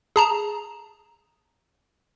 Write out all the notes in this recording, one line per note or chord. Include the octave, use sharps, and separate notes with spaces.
G#4 A5 A#5